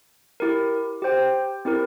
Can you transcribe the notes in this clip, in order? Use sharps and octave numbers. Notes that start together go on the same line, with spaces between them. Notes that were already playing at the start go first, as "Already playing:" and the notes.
E4 G4 A#4
G4 C5 G5
C4 E4 G4 A#4